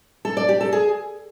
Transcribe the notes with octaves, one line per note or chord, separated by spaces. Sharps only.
A4
D5
G4
A4
G#4